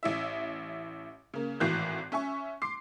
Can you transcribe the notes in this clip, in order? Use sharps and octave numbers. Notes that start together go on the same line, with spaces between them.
A1 E4 E5
C#3 A#3
G#1 A2 E3 F#4 F#6 G6
C#4 E5 G#5 C#6
C6 D6 C7